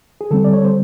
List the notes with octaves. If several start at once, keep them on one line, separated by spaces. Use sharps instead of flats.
G#4
D3 G3 C4 A4
D5
C#5
C5